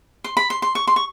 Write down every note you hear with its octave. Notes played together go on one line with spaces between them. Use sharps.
C6
B5
C6
C6
C#6
C6
C#6